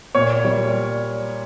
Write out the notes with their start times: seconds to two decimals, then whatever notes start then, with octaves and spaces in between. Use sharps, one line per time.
0.15 A#2 C#5
0.45 G3